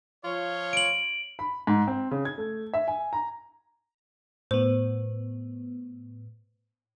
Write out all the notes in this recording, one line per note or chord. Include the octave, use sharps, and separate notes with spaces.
F3 F4 C#5
D7 F#7
B5
G#2
C4
C#3
G#6
A3
E5
G#5
A#5
A2 B3 C5